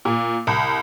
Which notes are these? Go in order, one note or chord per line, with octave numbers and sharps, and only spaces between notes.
A#2
C2